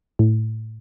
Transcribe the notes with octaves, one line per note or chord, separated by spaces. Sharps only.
A2